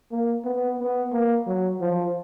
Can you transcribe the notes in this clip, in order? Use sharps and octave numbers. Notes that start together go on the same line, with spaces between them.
A#3
B3
B3
A#3
F#3
F3